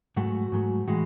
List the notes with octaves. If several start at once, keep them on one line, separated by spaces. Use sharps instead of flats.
G#2 F#3 A3 F#4
G#2 F#3 A3
A2 E3 G#3 F#4